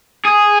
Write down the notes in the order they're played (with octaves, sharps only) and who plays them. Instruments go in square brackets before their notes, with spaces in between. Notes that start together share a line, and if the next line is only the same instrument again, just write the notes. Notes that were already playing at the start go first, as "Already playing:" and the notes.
[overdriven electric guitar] G#4